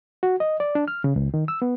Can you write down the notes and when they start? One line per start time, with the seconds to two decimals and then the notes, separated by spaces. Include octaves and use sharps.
0.23 F#4
0.40 D#5
0.60 D5
0.75 D4
0.88 F6
1.04 C#3
1.16 C#2
1.34 D#3
1.48 E6
1.62 B3